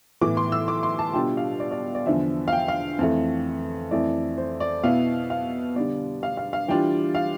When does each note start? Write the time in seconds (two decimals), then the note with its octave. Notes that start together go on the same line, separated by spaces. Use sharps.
0.21 A2 E3 B3 D6
0.37 C6
0.52 E6
0.68 D6
0.83 C6
0.99 A5
1.14 B2 G3 D4 F4 G5
1.37 F5
1.60 D5
1.71 D5
1.95 D5
2.06 E2 D3 F3 E5
2.48 F5
2.52 G5
2.68 F5
2.99 F2 E3 A3
3.91 F2 E3 A3 E4 D5
4.38 C5
4.60 D5
4.84 B2 B3 E4 F5
5.30 F5
5.76 D3 G3 B3 D5
6.23 F5
6.37 F5
6.53 F5
6.68 E3 G3 D4 F4 G5
7.15 F5